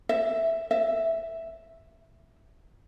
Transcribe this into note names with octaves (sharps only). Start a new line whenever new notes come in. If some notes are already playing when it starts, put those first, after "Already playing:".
E5
E5